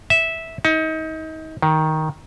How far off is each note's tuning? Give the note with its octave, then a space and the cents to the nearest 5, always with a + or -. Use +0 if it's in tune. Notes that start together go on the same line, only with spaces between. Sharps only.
E5 -10
D#4 +30
D#3 +10